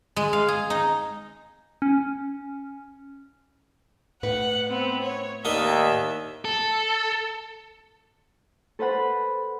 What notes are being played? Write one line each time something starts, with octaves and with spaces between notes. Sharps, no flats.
G#3
F5
G#4
D#4
C#4
A2 B4 F#5
B3 C4
C#5
D#2 A#3 D4 D#5 E5
A4
A4 B4 C5 F#5 B5